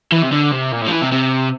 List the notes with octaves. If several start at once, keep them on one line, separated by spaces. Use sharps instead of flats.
E3
C3
D3
C3
A#2
A2
F3
E3
C3
C3